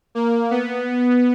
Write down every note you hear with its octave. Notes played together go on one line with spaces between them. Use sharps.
A#3
B3